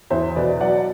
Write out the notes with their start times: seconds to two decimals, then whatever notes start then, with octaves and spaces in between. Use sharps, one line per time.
0.10 E2 C5 E5
0.36 B2 B4 D5
0.60 F#3 D5 F#5